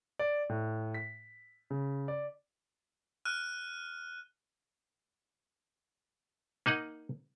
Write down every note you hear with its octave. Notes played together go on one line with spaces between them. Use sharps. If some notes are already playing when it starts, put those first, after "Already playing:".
D5
A2
B6
C#3
D5
F6 F#6 D#7
A#3 D#4 D#5 F#5